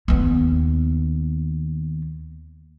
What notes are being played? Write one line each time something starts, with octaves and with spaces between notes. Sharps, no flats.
D#2 B3